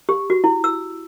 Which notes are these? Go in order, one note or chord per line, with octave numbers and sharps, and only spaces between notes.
G4
F#4
E4
E6